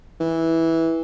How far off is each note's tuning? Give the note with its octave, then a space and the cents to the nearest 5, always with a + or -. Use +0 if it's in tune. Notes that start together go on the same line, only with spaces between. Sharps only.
E3 -10